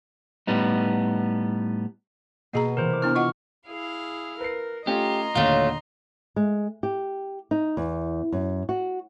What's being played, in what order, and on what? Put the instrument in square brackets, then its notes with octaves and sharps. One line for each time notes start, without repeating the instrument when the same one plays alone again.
[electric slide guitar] A2 G3 B3 D#4
[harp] B2 D#5 C7 [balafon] A#3 G#4 A#5
[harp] C3 E3 [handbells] A#4 C5
[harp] A3 D6
[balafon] B3 D4 E4 [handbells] F6
[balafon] F4 D#5 F#5 [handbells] C#6
[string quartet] E4 G#4 F5
[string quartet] A#4 [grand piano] B4 C7
[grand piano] A3 C#4 F4 [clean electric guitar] G4 [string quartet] D#5 A#5 C6
[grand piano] D#2 A#2 D3 [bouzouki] F#3 D#4 F5 [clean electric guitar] A3 F4
[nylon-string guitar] G#3
G4
D#4
E2
F#2
F#4